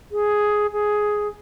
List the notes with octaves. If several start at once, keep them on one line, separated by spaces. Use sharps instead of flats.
G#4
G#4